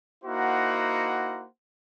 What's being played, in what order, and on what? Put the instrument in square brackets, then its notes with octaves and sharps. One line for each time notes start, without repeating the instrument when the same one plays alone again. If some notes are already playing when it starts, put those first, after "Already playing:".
[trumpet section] A#3 D#4 E4 F#4 C5 F#5